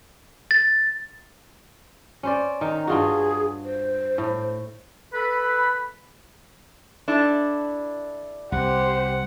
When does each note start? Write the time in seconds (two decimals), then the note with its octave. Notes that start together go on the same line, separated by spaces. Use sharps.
0.51 A6
2.23 C#4 C5 D5
2.61 D#3 A#5
2.87 G2 F4 F#4 G#4
3.64 C5
4.18 A2
5.13 A4 B4 B5
7.08 D4 E4 A4
8.52 C2 G4 C5 F#5